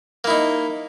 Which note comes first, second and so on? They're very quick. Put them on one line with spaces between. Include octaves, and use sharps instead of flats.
A#3 E4 D#4